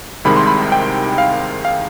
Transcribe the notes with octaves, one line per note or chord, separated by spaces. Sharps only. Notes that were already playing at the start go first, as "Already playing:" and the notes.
C2 C3 D#3 G#3 B5
C6
B5
G5
F5
F5